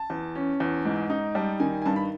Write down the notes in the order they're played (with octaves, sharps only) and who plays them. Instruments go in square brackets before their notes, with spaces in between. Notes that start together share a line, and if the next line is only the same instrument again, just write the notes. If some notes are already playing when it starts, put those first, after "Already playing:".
Already playing: [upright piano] A5
E2
C#4
E2
G#2
D#4
G3 A5
D#3 G#5
G#5
G2 A5
B5